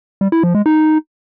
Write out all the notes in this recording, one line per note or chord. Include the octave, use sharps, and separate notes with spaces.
G3
E4
F3
G#3
D#4